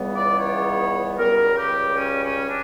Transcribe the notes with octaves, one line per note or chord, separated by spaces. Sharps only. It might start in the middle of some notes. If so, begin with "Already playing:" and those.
Already playing: C#2 C#3 E3 G3 B3
D5
C#5
C#2 C#3 G3 A#4
G4
C#4
C#4
D4